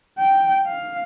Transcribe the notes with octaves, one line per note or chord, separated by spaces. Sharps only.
G5
F5